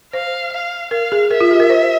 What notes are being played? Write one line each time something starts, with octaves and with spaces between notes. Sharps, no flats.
C5 F5
F5
A#4 F5
G#4
A#4 E5
F4
G4
A#4
C5